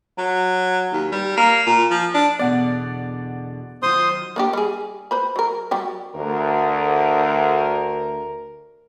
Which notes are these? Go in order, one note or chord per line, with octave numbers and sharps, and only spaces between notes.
F#3
D#2
G3
A#3
A#2
F3
D4
E2 B2 D3 B3 D5 F#5
D#3 F#3 F4 C5 C6 D#6
A#3 D4 G4
G3 G#4
B4 C5 B5
F#3 A#4
F#3 G3 G4
D2 A#4